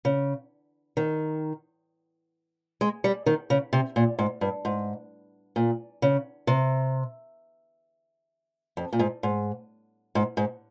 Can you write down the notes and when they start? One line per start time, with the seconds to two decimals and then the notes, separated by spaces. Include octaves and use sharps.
0.05 C#3
0.97 D#3
2.81 G#3
3.04 G3
3.26 D#3
3.50 C#3
3.73 C3
3.96 A#2
4.19 G#2
4.41 G2
4.65 G#2
5.56 A#2
6.02 C#3
6.47 C3
8.77 F2
8.93 A#2
8.99 G#2
9.23 G#2
10.15 G#2
10.37 G#2